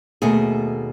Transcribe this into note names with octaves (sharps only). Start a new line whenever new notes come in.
D#2 B2 A3 G#4